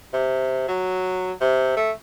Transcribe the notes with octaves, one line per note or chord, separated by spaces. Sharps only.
C3
F#3
C3
A3